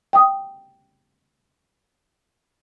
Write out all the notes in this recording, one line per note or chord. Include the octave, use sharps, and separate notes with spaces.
G5 D#6